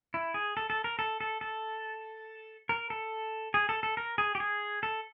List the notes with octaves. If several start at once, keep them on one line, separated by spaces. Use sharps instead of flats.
E4
G#4
A4
A4
A#4
A4
A4
A4
A#4
A4
G#4
A4
A4
A#4
G#4
G4
G#4
A4